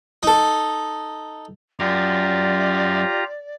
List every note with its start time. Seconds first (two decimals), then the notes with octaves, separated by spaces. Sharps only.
0.23 D#4 A4
1.80 F#2 F4 G4 D5 A#5